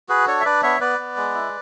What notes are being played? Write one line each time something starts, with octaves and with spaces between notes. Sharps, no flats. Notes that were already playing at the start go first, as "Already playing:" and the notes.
F#4 G#4 B4
D4 A4 C#5
E5
D4 B4 D5
B3 C#5 E5
B3 B4 D5
B3
G#3
E4